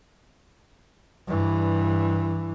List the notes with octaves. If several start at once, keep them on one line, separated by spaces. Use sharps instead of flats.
G2 E3